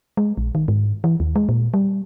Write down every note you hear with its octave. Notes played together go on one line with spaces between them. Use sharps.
G#3
A#1
D#3
G#2
E3
D#2
G#3
A#2
G3